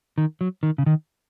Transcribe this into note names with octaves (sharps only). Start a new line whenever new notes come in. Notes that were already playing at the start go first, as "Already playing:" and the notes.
D#3
F#3
D#3
C#3
D#3